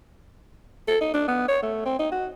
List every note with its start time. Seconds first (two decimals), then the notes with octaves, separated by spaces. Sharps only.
0.88 A4
1.01 D#4
1.14 D4
1.28 B3
1.48 C#5
1.63 A3
1.86 C4
1.99 D#4
2.12 F#4